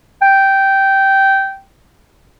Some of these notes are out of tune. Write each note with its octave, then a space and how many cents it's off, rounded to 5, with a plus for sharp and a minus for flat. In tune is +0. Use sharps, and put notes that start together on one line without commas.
G5 -10